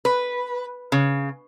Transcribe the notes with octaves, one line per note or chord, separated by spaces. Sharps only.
B4
C#3